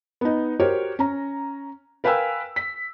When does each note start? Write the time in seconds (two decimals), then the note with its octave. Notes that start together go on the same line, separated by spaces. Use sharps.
0.21 B3 D#4
0.60 F#4 G4 A#4 C5 C#5
0.99 C#4 A#5
2.04 A#4 B4 F5 G5 G#5 E6
2.56 B6